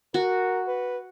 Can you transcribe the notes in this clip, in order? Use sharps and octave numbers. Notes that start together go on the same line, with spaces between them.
F#4 A#4
B4